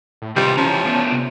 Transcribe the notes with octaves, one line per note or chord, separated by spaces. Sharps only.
A2
C3 D#3 E3 G3 F4
E3 F3 C4 C#4 A#5
A3 B3 D4
C3